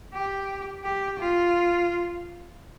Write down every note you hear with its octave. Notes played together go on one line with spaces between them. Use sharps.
G4
G4
F4